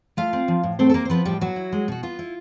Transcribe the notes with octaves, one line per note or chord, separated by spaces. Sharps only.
A3 F4 F5
C4
F3
A2
A3 C4 C5
A4
A#3 C4 A#4
C5
F3 B3 B4
A2 G3 G4
F#3 B3 F#4
E4
G#3
B2 F#4
B3 F4
E4